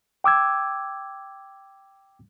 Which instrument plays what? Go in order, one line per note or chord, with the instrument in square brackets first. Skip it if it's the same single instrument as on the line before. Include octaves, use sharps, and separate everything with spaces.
[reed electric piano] G5 D6 E6 G#6